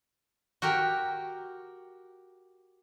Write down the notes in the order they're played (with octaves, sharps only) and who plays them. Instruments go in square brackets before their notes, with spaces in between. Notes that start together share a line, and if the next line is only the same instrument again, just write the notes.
[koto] F#4 G4 A#4 G5